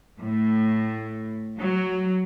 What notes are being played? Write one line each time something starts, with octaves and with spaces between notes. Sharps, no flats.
A2
F#3